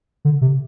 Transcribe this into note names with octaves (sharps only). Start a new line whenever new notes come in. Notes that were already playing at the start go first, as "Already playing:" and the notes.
D3
C3